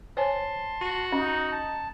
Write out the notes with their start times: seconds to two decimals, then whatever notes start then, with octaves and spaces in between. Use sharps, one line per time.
0.17 C5 C#5 G#5 A5 C6
0.81 F#4
1.12 C#4 D#4
1.52 A5